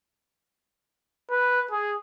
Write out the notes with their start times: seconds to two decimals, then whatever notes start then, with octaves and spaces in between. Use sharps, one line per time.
1.31 B4
1.71 G#4